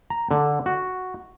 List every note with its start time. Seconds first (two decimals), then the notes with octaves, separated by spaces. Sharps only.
0.10 A#5
0.31 D3
0.66 F#4